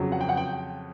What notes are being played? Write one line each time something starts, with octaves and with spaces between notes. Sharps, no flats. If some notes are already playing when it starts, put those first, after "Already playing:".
Already playing: F2 C#3 F#3
F#5
G5
F#5
G5